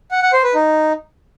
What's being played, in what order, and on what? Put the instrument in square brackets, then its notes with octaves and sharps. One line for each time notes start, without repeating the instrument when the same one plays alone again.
[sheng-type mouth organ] F#5
F#5
C5
B4
D#4